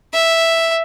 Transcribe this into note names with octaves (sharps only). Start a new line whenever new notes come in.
E5